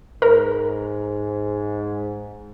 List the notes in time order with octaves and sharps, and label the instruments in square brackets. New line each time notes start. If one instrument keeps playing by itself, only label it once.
[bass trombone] G#2 [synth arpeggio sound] A#4